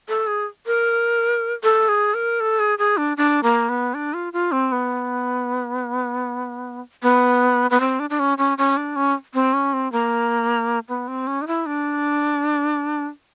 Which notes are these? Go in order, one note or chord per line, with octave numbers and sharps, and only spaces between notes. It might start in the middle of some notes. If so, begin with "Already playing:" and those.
A4
G#4
A#4
A4
G#4
A#4
A4
G#4
G#4
D4
D4
A#3
B3
D4
F4
F4
C4
B3
B3
B3
C4
D4
D4
C#4
C#4
C#4
D4
C#4
C4
C#4
C4
A#3
B3
C4
C#4
D#4
E4
D4